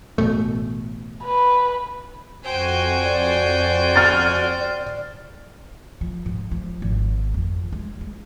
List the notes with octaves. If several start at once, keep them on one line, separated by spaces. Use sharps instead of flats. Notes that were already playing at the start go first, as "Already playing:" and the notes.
A1 B2 A3
B4
F2 F#4 C5 G5 G#5
D5
F6 A6
F3
G#2
F3
G#1
F2
G#3
G#3